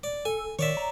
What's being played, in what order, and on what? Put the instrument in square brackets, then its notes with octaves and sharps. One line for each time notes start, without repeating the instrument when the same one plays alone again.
[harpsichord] D5
[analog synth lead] A4 [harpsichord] G#5
[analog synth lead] D#3 [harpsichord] C#5 D5 E5
[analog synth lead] A#5